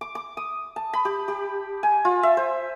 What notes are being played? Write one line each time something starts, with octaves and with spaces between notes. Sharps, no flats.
D6
D6
D#6
A5
B5
G4
G4
G#5
F4
E5
C5